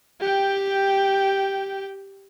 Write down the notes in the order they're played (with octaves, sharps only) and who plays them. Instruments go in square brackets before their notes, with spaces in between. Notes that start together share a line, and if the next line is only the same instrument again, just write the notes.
[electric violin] G4 G5